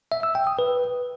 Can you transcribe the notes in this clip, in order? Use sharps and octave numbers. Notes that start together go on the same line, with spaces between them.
E5
E6
G5
D#6
B4